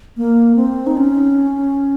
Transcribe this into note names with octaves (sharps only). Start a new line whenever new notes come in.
A#3
C4
D#4
C#4